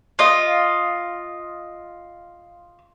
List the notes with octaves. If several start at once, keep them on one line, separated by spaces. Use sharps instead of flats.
F4 D#5